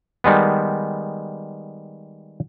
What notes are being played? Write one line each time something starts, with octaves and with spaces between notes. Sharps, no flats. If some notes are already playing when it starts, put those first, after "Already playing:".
D#3 G3 G#3 B3